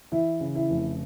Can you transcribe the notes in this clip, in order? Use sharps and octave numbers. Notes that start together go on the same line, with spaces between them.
E3 E4
C#3
E4
F1